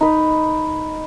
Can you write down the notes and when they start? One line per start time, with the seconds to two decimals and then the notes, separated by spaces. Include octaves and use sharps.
0.01 D#4 B4